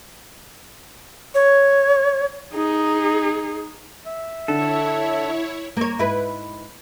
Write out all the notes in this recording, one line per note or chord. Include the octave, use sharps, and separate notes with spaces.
C#5
D#4 G#4
E5
D3 E4 A4 C#5
A#3 C#5
G#2 E4 B4